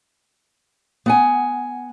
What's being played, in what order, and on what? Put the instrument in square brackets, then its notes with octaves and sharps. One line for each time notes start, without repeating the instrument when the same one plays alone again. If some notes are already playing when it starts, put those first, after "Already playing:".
[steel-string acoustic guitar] B3 F#5 G#5